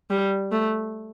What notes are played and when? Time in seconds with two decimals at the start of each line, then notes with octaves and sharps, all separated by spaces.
0.10 G3
0.52 A3